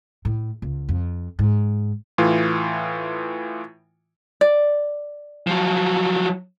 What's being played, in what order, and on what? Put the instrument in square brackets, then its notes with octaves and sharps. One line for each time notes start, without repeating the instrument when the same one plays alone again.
[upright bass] A2
C#2
F2
G#2
[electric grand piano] A2 E3 F4
[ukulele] D5
[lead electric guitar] F3 F#3